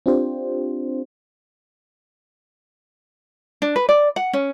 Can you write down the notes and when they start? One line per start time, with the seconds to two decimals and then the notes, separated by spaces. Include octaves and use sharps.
0.06 C4 D4 F4 G4 C5
3.62 D4
3.76 B4
3.89 D5
4.16 F#5
4.33 C#4